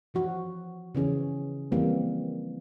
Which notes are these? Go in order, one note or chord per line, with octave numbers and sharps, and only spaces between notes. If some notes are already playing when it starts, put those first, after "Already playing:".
E3 F3 F#4
C#3 E3 C#4 G#4
E3 F3 G3 A#3 C4